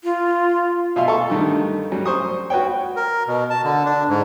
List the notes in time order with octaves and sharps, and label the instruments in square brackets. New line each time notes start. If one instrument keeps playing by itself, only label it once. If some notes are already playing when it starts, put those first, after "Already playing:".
[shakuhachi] F4
[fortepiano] B2 F4 E5 F5 C6
A4 C#6
G2 D3 D#3 A3
F#3 G3 C#4
C5 C#6 D#6
F#4 B4 C#5 G5
[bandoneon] A#4
B2
A5
D3
D4
G#2